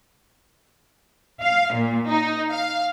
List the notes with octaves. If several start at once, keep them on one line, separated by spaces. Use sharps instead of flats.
F5
A#2
D#4
F5